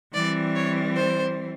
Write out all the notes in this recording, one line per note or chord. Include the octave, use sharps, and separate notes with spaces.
E3 G3 C4 D5
C#5
C5